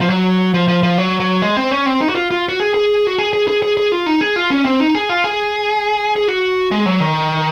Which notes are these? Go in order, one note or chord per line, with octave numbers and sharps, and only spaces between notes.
F3
F#3
F3
F3
F3
F#3
F#3
G#3
C4
C#4
C4
D#4
F#4
F4
F4
F#4
G#4
G#4
F#4
G#4
G#4
G#4
G#4
G#4
F4
D#4
G#4
F4
C#4
C4
D#4
G#4
F4
G#4
G#4
F#4
G#3
F#3
D#3